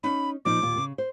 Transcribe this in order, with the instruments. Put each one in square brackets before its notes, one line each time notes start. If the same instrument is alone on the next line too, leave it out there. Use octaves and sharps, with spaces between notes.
[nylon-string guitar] C#4 D#4 [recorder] B5
[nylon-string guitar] A#2 F3 D#4 [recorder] D6
[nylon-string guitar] D#2 A#2 F4
C#3
C5